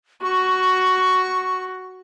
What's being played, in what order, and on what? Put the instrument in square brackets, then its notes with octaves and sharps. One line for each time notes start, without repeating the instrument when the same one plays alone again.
[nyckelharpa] F#4 [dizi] C#6